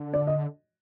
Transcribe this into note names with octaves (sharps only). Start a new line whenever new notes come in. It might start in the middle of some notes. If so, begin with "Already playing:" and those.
Already playing: D3
D5
D#5